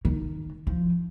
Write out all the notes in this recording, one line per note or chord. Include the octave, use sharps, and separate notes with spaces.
D#3
F3